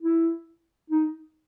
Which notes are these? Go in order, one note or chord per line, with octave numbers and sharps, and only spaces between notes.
E4
D#4